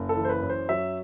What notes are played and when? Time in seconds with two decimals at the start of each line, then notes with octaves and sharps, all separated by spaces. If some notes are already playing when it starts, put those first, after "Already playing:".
Already playing: F#1
0.09 A4
0.16 E3
0.25 C5
0.29 B4
0.42 F#2
0.49 C5
0.69 F#3 E5